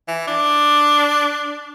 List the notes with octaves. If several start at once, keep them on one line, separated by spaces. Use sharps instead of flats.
E3
D4